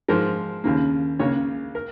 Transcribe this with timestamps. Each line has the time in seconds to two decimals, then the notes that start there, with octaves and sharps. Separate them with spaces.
0.08 G#2 F3 G#3 A#4
0.64 D#2 C#3 A#3
1.19 C#2 C#3 A#3 C#5
1.75 A#4